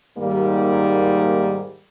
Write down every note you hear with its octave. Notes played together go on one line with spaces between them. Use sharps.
D#2 G#2 G3 A#3